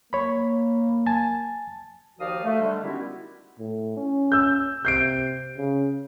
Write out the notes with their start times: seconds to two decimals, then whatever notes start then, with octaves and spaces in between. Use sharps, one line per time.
0.13 A#3 C#5 B5
1.06 G#5 A5 A6
2.19 D#2 F3 F#4 D5 F5 D#6
2.44 A3
2.61 D3 G3 G#3
2.83 D#3 B3 C#4 E4 F#4 G4
3.59 A2
3.97 C#4
4.32 E6 G6
4.85 C3 G6 C7 D7
5.57 C#3